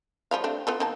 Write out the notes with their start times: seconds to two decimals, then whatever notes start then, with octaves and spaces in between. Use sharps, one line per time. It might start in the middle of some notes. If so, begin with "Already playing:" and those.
0.31 F3 G3 F5
0.44 A3 C4 D4
0.67 B3 F4 A4
0.80 D#3 A#3 A5